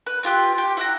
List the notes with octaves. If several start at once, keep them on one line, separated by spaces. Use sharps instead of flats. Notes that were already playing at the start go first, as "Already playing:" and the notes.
B4
C4 F4 G4 B4
G4
E4 F#5 A#5